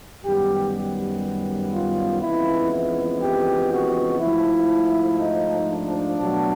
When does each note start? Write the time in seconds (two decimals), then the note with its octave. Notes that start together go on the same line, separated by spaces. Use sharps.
0.24 F#2 D#3 G3 B3 G4
1.72 F4
2.22 F2 C#3 E3 G#3 B3 E4
2.72 E4
3.21 G4
3.71 F#4
4.20 G#2 F3 A3 E4
5.19 D#4
5.69 D4
6.18 B2 F#3 A3